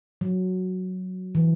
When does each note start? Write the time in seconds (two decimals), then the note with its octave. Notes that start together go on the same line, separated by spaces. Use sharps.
0.21 F#3
1.35 E3